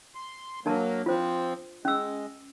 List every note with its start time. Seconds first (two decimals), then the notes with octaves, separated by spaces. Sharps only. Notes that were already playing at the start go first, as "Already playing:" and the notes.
0.15 C6
0.66 F#3 A#3 D4 A#4 A5
1.06 F3 C4 F4 C5
1.85 G#3 C#4 E6